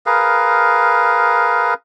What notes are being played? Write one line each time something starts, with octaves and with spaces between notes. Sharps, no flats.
G#4 A#4 B4 F5